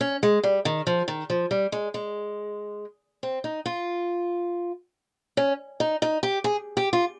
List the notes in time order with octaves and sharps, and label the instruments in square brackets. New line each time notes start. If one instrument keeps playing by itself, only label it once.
[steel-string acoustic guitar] C#4
G#3
G3
D#3
F3
D#3
F3
G3
G#3
G#3
C4
D#4
F4
C#4
D#4
D#4
G4
G#4
G4
F4